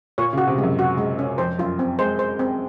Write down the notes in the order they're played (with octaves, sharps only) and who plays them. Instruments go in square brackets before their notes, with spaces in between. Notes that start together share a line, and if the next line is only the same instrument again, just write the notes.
[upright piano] A#2 [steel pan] C#5
[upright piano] C#3
[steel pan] F#4
[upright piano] C3
[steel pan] G#3
[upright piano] F#2
[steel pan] F#4
G#3
C#4
[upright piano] F2 [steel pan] C5
[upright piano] F#2 [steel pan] F4
[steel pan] C4
[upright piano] G#3 [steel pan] C5
[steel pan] C5
C4